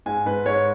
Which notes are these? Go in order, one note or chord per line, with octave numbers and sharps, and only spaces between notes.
G#2 G#5
G#2 B4
G#2 C#5